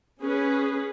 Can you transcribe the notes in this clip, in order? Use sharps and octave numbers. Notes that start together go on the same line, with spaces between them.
C#4 G#4 B4